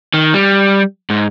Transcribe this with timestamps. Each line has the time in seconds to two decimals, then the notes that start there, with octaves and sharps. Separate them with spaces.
0.14 D#3
0.34 G3
1.10 G#2